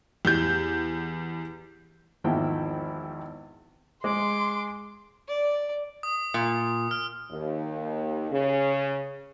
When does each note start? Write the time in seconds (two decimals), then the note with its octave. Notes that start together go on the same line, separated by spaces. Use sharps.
0.25 E2 G4 G6
2.24 G#1 E2 D#3 F3 E4 G5
4.04 G#3 C6 D6
5.28 D5
6.03 D#6
6.34 A#2
6.91 F6
7.32 D#2
8.32 C#3